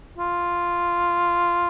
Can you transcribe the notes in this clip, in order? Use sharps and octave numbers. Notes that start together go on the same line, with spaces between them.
F4